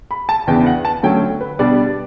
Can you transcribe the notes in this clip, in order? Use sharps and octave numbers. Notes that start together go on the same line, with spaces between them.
B5
A5
E2 C#3 E3 B3 D4 G5
F#5
A5
D3 F#3 A3 C#4 G5
B4
B2 G3 B3 D4 D5